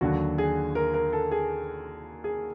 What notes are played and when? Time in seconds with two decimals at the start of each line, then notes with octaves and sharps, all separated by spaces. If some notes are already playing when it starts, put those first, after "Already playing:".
0.01 D#2 D3 F#3 F#4
0.38 G#4
0.75 A#4
0.94 A#4
1.13 A4
1.32 G#4
2.24 G#4